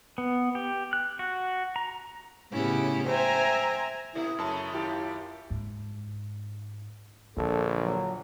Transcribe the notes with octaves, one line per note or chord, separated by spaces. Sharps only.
B3
G4
F#6
F#4
A#5
A2 C#3 B3 C#4 E4 G4
C5 E5 G5 G#5 A#5
B2 A3 B3 E4
F#2 C#3 G#3 A3 A5 B5
D#2 E4 F4 G4
G#2
A#1 D3 A4
F#3